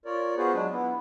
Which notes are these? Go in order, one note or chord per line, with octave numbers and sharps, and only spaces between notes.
F4 A#4 C#5 D5
B3 F4 F#4 G#4 B4 C5
F#3 G#3 D4
B3 E4